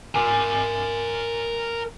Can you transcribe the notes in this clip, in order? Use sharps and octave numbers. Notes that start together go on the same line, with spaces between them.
A#4 G#5